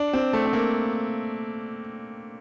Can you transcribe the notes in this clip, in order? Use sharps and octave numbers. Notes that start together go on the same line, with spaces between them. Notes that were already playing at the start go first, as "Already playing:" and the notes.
Already playing: D4
C4
A3
C4
A#3